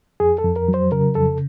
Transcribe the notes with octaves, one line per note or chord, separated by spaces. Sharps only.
F2 G#4
A4
F2
A#4
F#3
C5
C#3 A#4
F2 A4